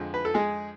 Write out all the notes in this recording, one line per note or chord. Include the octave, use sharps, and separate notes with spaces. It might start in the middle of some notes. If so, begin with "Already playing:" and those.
Already playing: F2 D3 F3 G#3
B4
A4
G#3 G#4